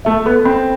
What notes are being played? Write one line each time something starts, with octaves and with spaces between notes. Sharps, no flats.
A3 E5
B3 A4
C4 B5